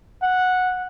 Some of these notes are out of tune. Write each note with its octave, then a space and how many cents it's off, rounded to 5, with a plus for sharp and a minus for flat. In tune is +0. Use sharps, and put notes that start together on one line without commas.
F#5 -10